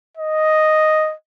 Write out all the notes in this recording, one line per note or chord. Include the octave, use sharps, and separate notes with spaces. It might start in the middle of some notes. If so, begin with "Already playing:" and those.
D#5